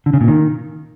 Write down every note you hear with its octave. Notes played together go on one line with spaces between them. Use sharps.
D3
C#3
A#2
D#3